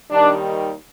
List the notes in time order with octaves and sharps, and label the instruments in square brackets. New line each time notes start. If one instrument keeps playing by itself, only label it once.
[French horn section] D#2 D#3 G3 D4